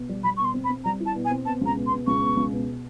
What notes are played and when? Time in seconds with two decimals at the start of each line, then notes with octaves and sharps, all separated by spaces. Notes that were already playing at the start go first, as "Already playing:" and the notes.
Already playing: B2
0.09 G3
0.24 G3 B5
0.37 B2 C#6
0.45 C6
0.54 C4
0.64 B5
0.70 C4
0.85 G3 A#5
1.00 E4
1.06 A5
1.15 B2
1.25 G#5
1.31 C4
1.45 B2 A5
1.61 C#2 A#5
1.77 B2
1.87 C6
1.91 B2
2.07 C#2 C#6
2.22 B2
2.37 C#2
2.52 B2